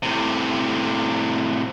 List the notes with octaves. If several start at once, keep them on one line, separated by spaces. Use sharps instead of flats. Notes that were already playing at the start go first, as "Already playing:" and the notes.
A2 C3